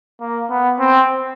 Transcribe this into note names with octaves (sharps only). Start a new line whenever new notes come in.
A#3
B3
C4